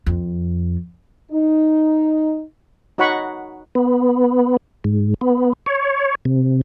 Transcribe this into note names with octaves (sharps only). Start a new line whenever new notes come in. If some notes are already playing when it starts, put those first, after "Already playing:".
F2
D#4
D#4 F#4 C#5 F#5 B5 C#6
B3
G#2
B3
C#5
C3